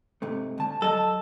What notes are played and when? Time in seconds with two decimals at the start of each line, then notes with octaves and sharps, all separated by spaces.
0.22 G#2 C3 A3
0.58 D2 A5
0.82 F#3 A4 D#5 A5